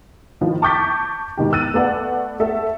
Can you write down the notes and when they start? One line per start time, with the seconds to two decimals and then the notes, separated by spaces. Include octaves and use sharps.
0.41 A2 D#3 F3
0.62 A5 C#6 D6 G6 A6 B6
1.37 G#2 B2 D#3 G4
1.53 E6 F#6 A6 D#7
1.74 A3 B3 B4 D5 F#5
2.40 A3 A4 E5